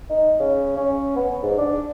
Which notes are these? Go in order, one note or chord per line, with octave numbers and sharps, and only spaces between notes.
D#4
C#3
C#4
B3
G#2
D4